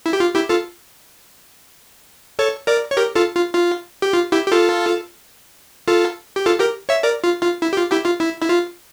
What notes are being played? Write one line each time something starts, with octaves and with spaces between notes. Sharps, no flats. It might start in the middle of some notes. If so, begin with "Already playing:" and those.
E4
G4
F4
E4 G4
F4 A4
A4 C#5
A#4 D5
C#5
G4 A#4
F4 A4
F4
F4
G4
F4
E4 G4
G4
F4 A4
F4 A4
G4
F4 A4
G4 A#4
C#5 E5
A#4 D5
F4
F4
E4
G4
F4
E4 G4
F4
E4
E4
F4